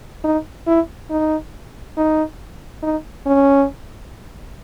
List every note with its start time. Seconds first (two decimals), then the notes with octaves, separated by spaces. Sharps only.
0.24 D#4
0.67 E4
1.10 D#4
1.97 D#4
2.82 D#4
3.26 C#4